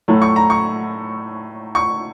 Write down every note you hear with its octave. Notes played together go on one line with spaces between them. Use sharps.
A2 F#3 A3
C#6
A#5
C#6
C#6